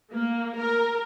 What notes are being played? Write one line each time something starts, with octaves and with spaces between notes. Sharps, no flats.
A#3
A#4